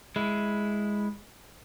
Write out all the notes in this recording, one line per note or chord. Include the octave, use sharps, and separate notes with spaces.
G#3 E4